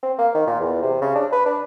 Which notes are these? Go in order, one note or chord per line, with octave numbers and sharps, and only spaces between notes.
C4
A#3
D#3
A#2
E2
C3
C#3
D4
B4
D4